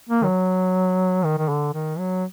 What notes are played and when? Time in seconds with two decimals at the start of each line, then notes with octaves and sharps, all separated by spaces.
0.09 A#3
0.22 D#3
0.25 F#3
1.25 D#3
1.38 D#3
1.49 D3
1.74 D#3
1.99 F#3